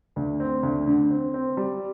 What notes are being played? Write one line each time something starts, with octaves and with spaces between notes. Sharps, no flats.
D2
C4
D2
D3
C4
C4
G3